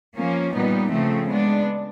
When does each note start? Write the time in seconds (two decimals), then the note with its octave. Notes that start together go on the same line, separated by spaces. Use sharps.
0.17 F3 A#3 C#4
0.53 A#2 G3 B3 D#4
0.90 C#3 F3 A3 C4
1.28 G#3 B3 D4